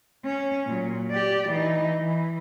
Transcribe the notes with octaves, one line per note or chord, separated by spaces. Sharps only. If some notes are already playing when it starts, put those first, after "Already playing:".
C#4
A#2 F#3
G4 D5
E3 D#4
E3